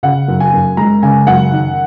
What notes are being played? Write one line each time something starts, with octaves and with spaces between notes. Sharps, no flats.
C#3 F#5
F#2
G#5
F#2
G#3 A#5
C#3 G#5
F#2 F#5
D#3